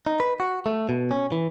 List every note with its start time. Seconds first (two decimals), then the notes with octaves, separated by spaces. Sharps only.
0.07 D#4
0.20 B4
0.40 F#4
0.66 A3
0.89 B2
1.11 C#4
1.32 E3